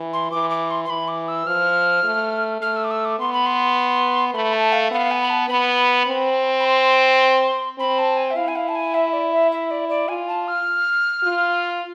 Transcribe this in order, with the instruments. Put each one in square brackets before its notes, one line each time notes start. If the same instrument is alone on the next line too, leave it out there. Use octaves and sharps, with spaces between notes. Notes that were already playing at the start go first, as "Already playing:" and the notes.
Already playing: [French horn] E3
[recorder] C6
[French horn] E3 [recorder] D6
[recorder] D6
C6
C6
[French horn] E3 [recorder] B5
[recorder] D6
E6
[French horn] F3 [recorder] F6
[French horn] A3
[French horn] A3 [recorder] F6
[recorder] E6
D6
E6
D6
[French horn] B3 [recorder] C6
[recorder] B5
C6
[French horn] A3 [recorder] B5
[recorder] A5
F5
[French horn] B3 [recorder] F5
[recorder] G#5
B5
A5
[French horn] B3 [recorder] B5
[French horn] C4
[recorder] B5
C6
[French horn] C4 [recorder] B5
[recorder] A5
G#5
E5
[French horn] E4 [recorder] F5
[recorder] G#5
F5
A5
G#5
E5
D5
E5
E5
D5
D5
[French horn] F4 [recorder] G#5
[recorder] A5
F6
[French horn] F4